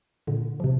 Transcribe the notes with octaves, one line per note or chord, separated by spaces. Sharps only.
A#2 D3
F3
C3